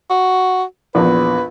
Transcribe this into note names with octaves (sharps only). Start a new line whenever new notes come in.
F#4
A#1 E2 B4